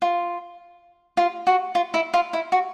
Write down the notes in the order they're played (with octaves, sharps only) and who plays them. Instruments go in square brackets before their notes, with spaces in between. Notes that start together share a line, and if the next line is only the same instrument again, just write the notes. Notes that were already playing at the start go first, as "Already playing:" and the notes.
[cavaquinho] F4
F4
F#4
F4
E4
F4
E4
F#4